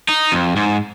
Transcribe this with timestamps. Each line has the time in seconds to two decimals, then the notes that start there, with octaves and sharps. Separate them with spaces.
0.09 D#4
0.32 F2
0.56 G#2